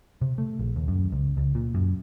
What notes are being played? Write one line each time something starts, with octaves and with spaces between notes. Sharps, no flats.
C3
A3
A#1
D#2
F#2
C#2
C#2
A#2
F#2